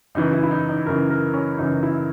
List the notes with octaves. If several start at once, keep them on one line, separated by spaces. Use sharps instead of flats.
F#2 C#3 E3 D#4
E4
E4
D#4
D#4
F#2 C#3 E3 A#4
A#4
C#4
F#2 C#3 E3 D#4
E4